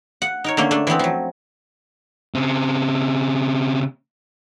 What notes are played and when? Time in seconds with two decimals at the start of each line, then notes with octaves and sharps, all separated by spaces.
0.22 F#5
0.44 D#4 A#4 C#5
0.57 D3 A3 A#3 C#4
0.71 A3 D4
0.87 E3 F3 B3 C4
0.99 F3 F#3
2.35 C#3 C4